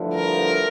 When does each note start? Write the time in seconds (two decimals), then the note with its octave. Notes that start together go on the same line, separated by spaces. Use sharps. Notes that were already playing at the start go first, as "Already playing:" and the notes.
Already playing: G2 D3 F3 A3 E4
0.13 A#4